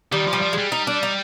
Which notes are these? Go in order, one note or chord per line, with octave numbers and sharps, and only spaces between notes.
D#3 G3
F3
G3
F3
G#3
G3
D#4
D4
D#4